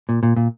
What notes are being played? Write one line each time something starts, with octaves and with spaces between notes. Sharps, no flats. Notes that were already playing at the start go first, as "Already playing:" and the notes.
A#2
A#2
A#2